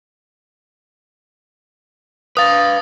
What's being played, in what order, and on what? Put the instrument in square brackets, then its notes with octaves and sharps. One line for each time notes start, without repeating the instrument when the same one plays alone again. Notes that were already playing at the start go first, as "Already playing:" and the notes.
[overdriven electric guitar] B4 F5 [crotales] D#6 A6